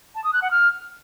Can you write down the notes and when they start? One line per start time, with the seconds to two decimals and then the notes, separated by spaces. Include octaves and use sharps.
0.15 A5
0.24 D#6
0.33 F#6
0.42 F#5
0.51 F6